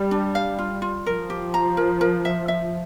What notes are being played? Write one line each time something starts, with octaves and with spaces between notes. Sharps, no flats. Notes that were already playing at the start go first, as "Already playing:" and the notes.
Already playing: G3
D4
F5
F4
F4
F3 A#4
G4
A#5
A#4
A#4
E5
E5